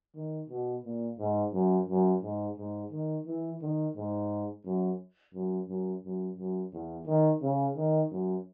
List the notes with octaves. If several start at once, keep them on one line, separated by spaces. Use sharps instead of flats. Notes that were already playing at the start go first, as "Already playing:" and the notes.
D#3
B2
A#2
G#2
F#2
F#2
G#2
G#2
D#3
E3
D#3
G#2
F#2
F#2
F#2
F#2
F#2
E2
D#3
C#3
D#3
F#2